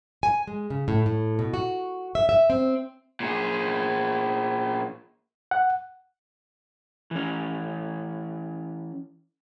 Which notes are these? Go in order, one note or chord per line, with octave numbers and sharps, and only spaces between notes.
G#5
G#3
C#3
A2
A2
B2
F#4
E5
E5
C4
A#2 G#4
F#5
E3 C#4